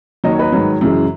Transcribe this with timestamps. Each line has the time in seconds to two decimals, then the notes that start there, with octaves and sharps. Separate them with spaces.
0.24 D#2 D#3 F#3 D#5
0.32 C#5
0.39 B4 D#5
0.52 G#2 D#3 F#3
0.81 F#2 C#3 E3 G#3